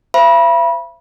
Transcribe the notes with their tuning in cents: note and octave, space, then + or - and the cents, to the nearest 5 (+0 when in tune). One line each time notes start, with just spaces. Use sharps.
C5 +0 E5 +45 B5 -25